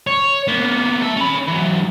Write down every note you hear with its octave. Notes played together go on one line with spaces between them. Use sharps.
C#5
A#3 B3
A4 E5
C#4 B5
E3 F#3